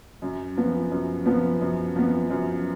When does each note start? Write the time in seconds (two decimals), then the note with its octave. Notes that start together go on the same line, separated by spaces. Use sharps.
0.22 F#2
0.57 F3 B3
0.91 F#2
1.26 F3 B3
1.61 F#2
1.96 F3 B3
2.30 F#2